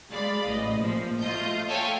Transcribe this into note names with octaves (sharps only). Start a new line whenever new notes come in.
G#3 D5 F5 B5
A1 D#5
A#2 F3
A3 F4 D#5 G6
A4 C#5 E5 F5 G5 G#5